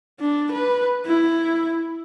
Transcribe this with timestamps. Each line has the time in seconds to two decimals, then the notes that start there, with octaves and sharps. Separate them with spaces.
0.20 D4
0.52 B4
1.05 E4